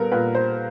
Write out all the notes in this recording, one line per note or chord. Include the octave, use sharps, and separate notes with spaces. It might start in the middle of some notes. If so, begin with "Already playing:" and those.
Already playing: A#2 G3 B3 A4 A#4
A#2 B4
C5